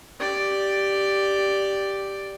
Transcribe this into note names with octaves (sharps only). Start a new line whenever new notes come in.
G4 D5